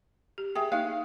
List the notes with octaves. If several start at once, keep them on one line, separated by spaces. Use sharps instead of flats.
G4
G#4 E5 G5
A#3 D#4 F5